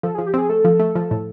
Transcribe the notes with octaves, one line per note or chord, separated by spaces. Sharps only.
F3 A4
G#4
F3
G4
C4 G#4
A3 A4
F3
A3
F3
A2